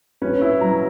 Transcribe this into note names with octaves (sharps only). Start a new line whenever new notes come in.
C#4 B4
E4
F#3 A#5